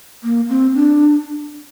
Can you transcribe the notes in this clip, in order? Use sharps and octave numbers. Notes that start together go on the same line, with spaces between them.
A#3
C4
D4